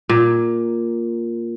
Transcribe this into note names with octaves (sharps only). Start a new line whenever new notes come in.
A#2